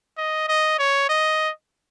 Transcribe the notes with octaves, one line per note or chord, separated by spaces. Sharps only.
D#5
D#5
C#5
D#5